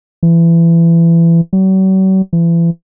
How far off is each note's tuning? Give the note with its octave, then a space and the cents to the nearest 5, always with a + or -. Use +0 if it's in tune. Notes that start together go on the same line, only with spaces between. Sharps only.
E3 +25
F#3 +45
E3 +35